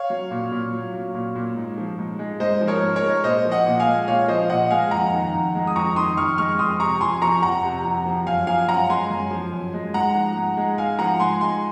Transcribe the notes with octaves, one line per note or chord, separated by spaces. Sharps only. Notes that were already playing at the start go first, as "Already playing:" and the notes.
Already playing: C#5 F5
F#3
A#2
A#2
F#3
F#3
A#2
A#2
G#2
F3
G#2
G#3
G#2 C5 D#5
F3
A#4 C#5
G#2
A#4 C#5
G#3
A#2 C5 D#5
F3
D#5 F#5
A#2
F5 G#5
G#3
A#2 C#5 F5
F3 C5 D#5
A#2 D#5 F#5
G#3 F5 G#5
F2 F#5 A#5
D#3
F2
G#3
D#6
F2 A#5 C#6
D#3 C6 D#6
F2 C#6 F6
G#3 C#6 F6
F2 C6 D#6
C3 A#5 C#6
F2 G#5 C6
F3 A#5 C#6
F2 F#5 A#5
C3
F2
F3
F#2 F5 G#5
F3 F5 G#5
F#2 F#5 A#5
G#3 G#5 C6
F#2
F3
F#2
G#3
G#2 F#5 A#5
F3
G#2
G#3
G#2 F5 G#5
F3 F#5 A#5
G#2 G#5 C6
G#3 G#5 C6